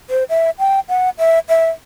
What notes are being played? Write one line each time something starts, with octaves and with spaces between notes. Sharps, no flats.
C5
E5
G5
F#5
E5
E5